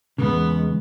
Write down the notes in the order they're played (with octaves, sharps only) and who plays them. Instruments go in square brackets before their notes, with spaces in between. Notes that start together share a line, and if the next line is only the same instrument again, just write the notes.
[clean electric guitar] E2 C#3 [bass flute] G#3 [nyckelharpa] B3